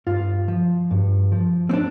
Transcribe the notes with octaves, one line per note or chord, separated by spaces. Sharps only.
G2 F4
F3
G2
F3
C4
D4